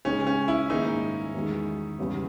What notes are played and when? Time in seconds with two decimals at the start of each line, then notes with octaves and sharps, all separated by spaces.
0.05 C#3 G#3 C#4 D#4 G#4
0.27 C#4
0.48 E4
0.70 G#2 D#3 A#3 D#4 E4 G#4
1.34 E2 D#3 G#3
1.99 E2 C#3 G3